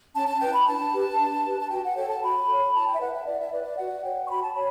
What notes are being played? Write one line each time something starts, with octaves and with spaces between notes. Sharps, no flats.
C#4 A5
A5
E4 B4 G5
B5
D4 A5
G4 B4
D4
G4 B4
A5
F#4 G5
F#5
A4 C#5 G5
A5
F#4 B5
A4 C#5
E4 A5
G5
E5
B4 F#5
E5
E4 D5
E5
B4 D5
D5
F#4 F#5
C#5 G5
C#6
F#4 B5
A5
C#5 B5